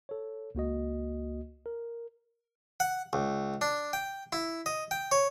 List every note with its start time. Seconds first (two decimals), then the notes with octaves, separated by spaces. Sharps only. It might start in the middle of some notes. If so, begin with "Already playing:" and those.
0.09 A4 C#5
0.55 C#2 A#3 F#4 D#5
1.66 A#4
2.80 F#5
3.13 C#2
3.61 D4
3.93 G5
4.33 E4
4.66 D#5
4.91 G5
5.12 C#5